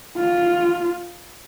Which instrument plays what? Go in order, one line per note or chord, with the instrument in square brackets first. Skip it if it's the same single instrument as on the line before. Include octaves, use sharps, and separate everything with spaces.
[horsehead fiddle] F4